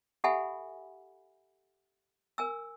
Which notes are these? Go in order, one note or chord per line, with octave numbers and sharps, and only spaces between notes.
G4 A4 E5 F#5 G#5 B5
A#4 G#5 E6